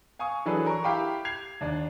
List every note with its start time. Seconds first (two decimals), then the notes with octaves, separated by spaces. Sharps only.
0.19 F5 G#5 C#6 D#6
0.46 E3 F#3 D4 G#4 A4 B4
0.66 A#4 C#6
0.84 E4 G4 F5 G5 B5 D6
1.25 G#6 C7 F7
1.61 D#2 D4